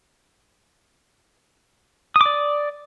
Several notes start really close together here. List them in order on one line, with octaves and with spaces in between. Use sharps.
D#6 D6 D5